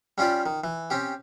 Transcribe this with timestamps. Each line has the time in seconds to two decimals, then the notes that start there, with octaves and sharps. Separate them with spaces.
0.18 G3 C#4 F4 G4 D5
0.46 D#3
0.64 E3
0.90 C4 C#4 G4